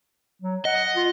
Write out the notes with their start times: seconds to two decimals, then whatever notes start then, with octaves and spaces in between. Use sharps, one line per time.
0.42 F#3
0.65 D#5 F#5
0.96 F4